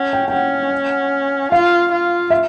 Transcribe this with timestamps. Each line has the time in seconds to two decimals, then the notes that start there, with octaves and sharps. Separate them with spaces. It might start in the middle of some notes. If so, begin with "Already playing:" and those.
Already playing: C#4 F#5
0.13 G5
0.28 G5
0.32 C#4 F#5
1.52 F4 F5
1.92 F4
2.30 E5